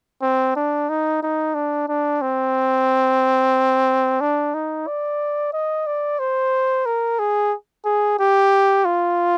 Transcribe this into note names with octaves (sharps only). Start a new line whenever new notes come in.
C4
D4
D#4
D#4
D4
D4
C4
D4
D#4
D5
D#5
D5
C5
A#4
G#4
G#4
G4
F4